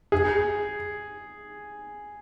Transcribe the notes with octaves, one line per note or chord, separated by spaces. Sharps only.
G#4